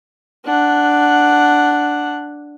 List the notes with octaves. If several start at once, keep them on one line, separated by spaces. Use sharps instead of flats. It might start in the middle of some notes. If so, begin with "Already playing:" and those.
D4 F#5